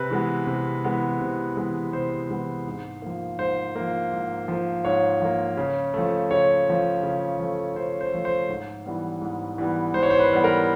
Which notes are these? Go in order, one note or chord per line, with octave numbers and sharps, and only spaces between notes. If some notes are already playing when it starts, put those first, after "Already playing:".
Already playing: C3 B4
E3 G#3 B3
C3
E3 G#3 B3
C3
E3 G#3 B3
C3 C5
E3 G#3 B3
G#2
F3 A#3
G#2 C5
F3 A#3
G#2
F3 A#3
G#2 C#5
F3 A#3
C#3
F3 A3
C#3 C#5
F3 A3
C#3
F3 A3
C#3 C5
C5
F3 A3
C5
G#2
E3 G3 B3
G#2
E3 G3 B3
G#2 C5
C#5
C5
B4
E3 G3 B3
A#4